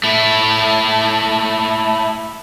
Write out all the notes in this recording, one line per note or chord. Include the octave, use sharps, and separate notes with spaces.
A3 E4